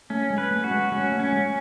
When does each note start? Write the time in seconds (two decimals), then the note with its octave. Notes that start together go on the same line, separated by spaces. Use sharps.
0.10 A3 C#4
0.30 G#3
0.38 B4
0.51 A3
0.64 F#4
0.71 G#3
0.92 G#3 C#4
1.12 A3
1.20 C#4
1.33 G#3